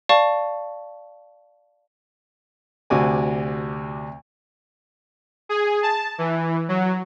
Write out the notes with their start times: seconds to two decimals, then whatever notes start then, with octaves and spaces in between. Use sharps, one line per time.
0.09 D5 F5 A5 C#6
2.90 D2 C3 F#4 D5 G#5
5.49 G#4
5.83 A5
6.18 E3
6.69 F#3